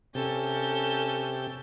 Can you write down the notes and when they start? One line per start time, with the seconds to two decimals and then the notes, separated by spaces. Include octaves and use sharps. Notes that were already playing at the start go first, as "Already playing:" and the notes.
0.15 C3 C#4 A4 G6